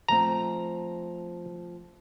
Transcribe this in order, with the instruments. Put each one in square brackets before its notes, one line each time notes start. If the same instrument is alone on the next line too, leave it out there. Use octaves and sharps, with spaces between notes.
[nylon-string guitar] F3 A3 C4 [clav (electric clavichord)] A#5